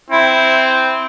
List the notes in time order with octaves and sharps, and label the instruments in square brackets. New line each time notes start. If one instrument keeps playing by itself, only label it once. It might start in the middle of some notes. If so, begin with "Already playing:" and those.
[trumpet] C4 [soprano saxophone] E4